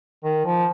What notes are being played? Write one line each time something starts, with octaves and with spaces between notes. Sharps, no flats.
D#3
F3